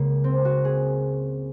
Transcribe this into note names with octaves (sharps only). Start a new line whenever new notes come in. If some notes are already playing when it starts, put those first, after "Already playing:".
Already playing: C#2 C#3 A#3
C4
F#4
G#4